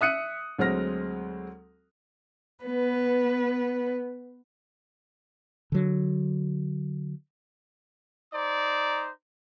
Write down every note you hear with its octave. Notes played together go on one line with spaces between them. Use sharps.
E5 D#6 F#6 C#7 D#7
D2 F#3 G#3 C4 F6 A#6
B3 B4
D3 F#3
D#4 C5 D5 A#5 D#6